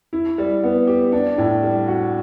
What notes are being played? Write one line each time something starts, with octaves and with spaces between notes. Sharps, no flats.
E4
G3
B3
G4
D4
A2
G3
F#4